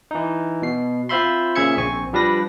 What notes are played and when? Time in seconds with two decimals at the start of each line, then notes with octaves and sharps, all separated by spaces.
0.11 E3 D#4
0.62 B2 C7
1.09 C4 F4 C5 E5 B5 C6
1.55 A#2 C#3 G#4 E5 G#6 C#7
1.77 A#1 C4 G#5 C#6
2.13 F3 G3 D4 B4 A#6